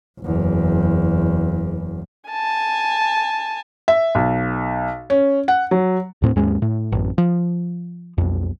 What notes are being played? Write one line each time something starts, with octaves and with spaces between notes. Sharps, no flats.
F#1 E2
G#5 A5
E5
B1
C#4
F#5
F#3
D#2 A2 C4
D#2 G#2 G#3 C#4
A2
A1 F#2
F3
B1 F2